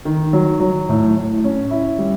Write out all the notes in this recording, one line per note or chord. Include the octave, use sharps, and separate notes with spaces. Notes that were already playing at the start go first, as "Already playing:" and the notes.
D#3
F#3
F#3
A2
A2
C#4
E4
G3